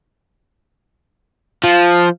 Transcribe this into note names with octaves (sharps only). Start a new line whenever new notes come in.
F3